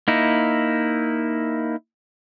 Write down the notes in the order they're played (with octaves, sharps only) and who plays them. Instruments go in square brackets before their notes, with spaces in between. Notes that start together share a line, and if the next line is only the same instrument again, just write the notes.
[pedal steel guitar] A#3 D#4 E4